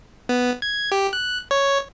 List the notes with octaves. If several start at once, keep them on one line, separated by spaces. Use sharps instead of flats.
B3
G#6
G4
F#6
C#5